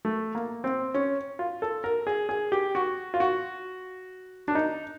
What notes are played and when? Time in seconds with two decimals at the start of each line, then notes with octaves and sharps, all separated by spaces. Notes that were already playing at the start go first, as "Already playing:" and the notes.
0.05 A3
0.35 A#3
0.64 C4
0.94 C#4
1.39 F4
1.62 A4
1.84 A#4
2.07 G#4
2.29 G#4
2.52 G4
2.75 F#4
3.14 F4
3.20 F#4
4.48 D4
4.55 D#4